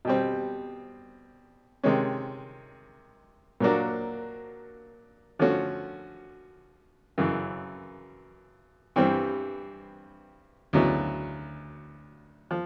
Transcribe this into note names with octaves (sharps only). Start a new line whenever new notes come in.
B2 G3 C4
C3 D#3 G#3 C#4
A#2 F#3 A#3 D4 F#4
D3 F3 A3 C#4 F#4
F#2 C#3 E3
G2 E3 G3 C4
D2 C#3 F#3 B3 E4
F3